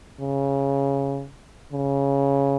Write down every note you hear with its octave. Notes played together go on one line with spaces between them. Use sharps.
C#3
C#3